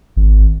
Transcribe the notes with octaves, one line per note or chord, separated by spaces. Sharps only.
G#1